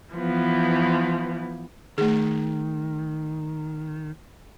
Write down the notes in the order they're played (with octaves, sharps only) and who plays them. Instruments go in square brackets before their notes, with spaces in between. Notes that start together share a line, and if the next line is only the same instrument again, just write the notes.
[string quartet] E3 F3 B3
[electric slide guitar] D#3 [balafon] A3 G#4